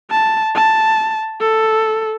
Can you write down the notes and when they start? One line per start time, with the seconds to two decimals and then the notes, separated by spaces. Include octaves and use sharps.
0.11 A5
0.55 A5
1.41 A4